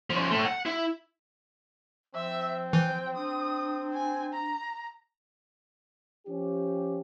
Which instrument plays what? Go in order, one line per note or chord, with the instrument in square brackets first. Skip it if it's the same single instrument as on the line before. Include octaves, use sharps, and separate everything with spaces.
[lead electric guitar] F3 C#4
A2 A3
F#5
E4
[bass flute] F3 [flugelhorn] C4 [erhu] E5
[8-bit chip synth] E3 [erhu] G5
[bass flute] D4 [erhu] D#6
[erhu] G#5
A#5
[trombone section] F3 C#4 G4